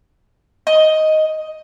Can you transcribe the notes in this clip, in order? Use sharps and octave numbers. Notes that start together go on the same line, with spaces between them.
D#5